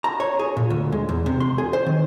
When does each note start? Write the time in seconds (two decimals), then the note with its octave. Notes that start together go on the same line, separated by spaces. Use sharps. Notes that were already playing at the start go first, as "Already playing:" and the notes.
0.04 A#5
0.20 C#5
0.39 G#4
0.57 A#2
0.70 D2
0.92 G#3
1.09 E2
1.26 C3
1.40 C6
1.58 G#4
1.73 C5
1.86 D#3